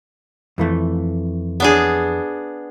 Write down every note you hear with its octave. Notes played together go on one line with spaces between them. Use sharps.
F2 E3 A3
B3 D4 G#4